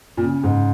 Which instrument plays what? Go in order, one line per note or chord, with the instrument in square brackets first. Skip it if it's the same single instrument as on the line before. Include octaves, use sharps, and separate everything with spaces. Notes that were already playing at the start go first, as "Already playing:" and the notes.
[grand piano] A#2
C#3
G#2